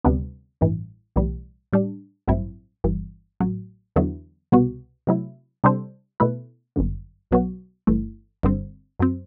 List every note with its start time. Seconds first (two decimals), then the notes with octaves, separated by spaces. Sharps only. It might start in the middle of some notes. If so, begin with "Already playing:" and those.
0.04 D2 C3 G3 B3 D4
0.61 A1 G2 E3
1.16 B1 A2 E3 G3
1.73 A2 G3 D4
2.28 A1 G2 F#3 C4 E4
2.84 G1 G2 E3
3.40 A1 A2 F#3
3.96 E2 D3 F#3 B3 E4
4.52 C2 B2 G3 B3 F#4
5.07 C3 F#3 A3 E4
5.64 C3 G3 D4 A4 C5
6.20 B2 A3 E4 B4
6.76 G1 F#2 D3
7.31 B1 B2 F#3 B3 F#4
7.87 G1 G2 E3 A3
8.43 G1 G2 D3 G3 C4
8.99 F#2 F#3 C4